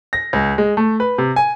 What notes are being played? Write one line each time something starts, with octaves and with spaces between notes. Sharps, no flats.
A#6
C#2
G#3
A3
B4
C3
G#5